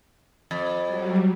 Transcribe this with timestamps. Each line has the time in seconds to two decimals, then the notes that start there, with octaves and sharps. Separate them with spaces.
0.51 F2
0.85 F#3 G3